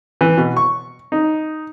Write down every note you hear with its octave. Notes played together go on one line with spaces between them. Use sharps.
E3
B2
C#6
D#4